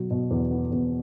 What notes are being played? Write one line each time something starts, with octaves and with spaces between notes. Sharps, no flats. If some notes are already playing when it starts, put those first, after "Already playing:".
Already playing: B2 F#3
B2
E2
B3
E2